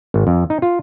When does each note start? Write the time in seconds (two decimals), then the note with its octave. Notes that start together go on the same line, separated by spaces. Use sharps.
0.14 G#1
0.27 F2
0.50 D#4
0.62 F4